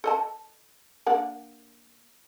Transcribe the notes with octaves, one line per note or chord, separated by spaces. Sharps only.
A4 D#5 A5
A#3 D4 F#5